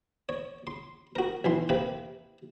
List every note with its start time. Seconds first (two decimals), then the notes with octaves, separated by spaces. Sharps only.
0.29 C#5
0.67 C6
1.16 F#4 A#4
1.44 B1 E3 C6
1.69 C3 A#3 B4 B5